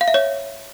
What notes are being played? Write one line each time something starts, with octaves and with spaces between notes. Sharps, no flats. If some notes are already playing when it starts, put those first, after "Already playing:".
F5
E5
C#5